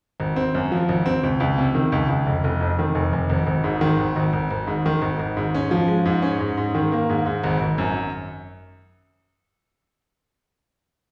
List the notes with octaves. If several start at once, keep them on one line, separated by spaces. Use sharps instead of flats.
G#1
C4
F#2
F3
G#1
C4
C#2
C#2
C3
D#3
C#2
C#2
F1
F1
F2
D#3
F1
F1
G#1
G#1
G#2
D#3
G#1
G#1
G#1
G#1
G#2
D#3
G#1
G#1
G#2
C#4
F3
G#3
G#2
C#4
G#2
G#2
D#3
A#3
G#2
G#2
G#1
G#1
F#2